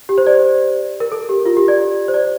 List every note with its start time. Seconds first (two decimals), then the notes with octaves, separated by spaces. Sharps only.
0.09 G4
0.18 C5
0.27 D5
0.34 C5
1.00 A#4
1.12 A4
1.29 G4
1.45 F4
1.57 G4
1.68 D5
2.08 C5
2.14 D5